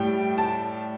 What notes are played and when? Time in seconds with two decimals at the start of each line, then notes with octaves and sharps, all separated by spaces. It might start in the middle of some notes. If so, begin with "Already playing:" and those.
Already playing: A2 G3 G5
0.38 A5